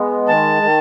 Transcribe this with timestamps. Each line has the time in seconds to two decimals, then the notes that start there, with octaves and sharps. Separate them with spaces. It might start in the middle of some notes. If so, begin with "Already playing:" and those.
Already playing: G#3 B3
0.27 D#3 A5
0.63 D#3